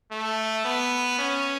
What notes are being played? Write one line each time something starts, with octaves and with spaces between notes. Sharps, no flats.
A3
B3
C#4